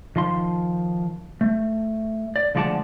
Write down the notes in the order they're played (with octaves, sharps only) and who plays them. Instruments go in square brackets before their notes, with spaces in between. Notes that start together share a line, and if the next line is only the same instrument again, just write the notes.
[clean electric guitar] D#3 F3 C6
A3
D5
D2 F3 G#3 D5 F#5 A5